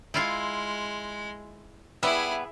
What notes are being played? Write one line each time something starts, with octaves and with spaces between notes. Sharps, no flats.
G#3 E4 F4 F5
G3 B3 E4 G#4 E5